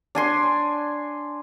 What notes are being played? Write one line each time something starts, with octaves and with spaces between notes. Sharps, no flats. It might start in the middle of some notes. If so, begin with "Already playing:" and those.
D4 G#5 C6